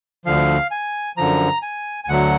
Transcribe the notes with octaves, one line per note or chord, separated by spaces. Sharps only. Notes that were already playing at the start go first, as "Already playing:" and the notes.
D2 D3 F3 F5
G#5
F#2 D3 F3 A#5
G#5
G#5
D2 D3 F#3 F#5